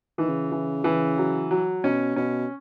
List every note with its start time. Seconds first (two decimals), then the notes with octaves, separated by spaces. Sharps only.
0.18 D#3 E3
0.29 C#3
0.52 E3
0.84 E3
1.18 F#3
1.51 F#3
1.84 B2 C#4
2.16 B2 C#4